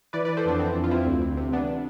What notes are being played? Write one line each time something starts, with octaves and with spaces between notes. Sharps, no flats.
E3 B4 D5
E3 B4 D5
A4 C5
F2 B3 D4
E3 C4
F2
F4
F2 C4 E4
D2
D2
C3
E3 B3 D4